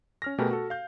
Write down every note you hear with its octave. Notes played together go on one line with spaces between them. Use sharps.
C#4 F6 A#6
B2 A3 G4 G#4 A#4 B4
F#4 A4
F5 G6